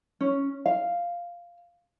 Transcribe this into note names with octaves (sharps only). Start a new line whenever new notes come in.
C#4
F5